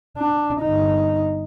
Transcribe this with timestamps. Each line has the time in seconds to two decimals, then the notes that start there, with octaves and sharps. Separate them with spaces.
0.17 D4
0.60 G1 D#4